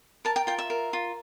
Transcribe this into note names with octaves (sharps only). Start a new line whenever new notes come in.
A#4 A5
G5
F4 G5
E5
A#4
F4